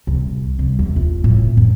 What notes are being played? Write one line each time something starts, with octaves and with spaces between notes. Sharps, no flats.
C2
C2
E2
F4
A2
D2
F#2